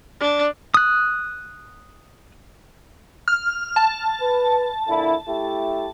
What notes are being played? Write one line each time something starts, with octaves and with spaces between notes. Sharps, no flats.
D4
D#6 F#6
F6
A5
B4
A#2 D3 E4
A3 E4 G4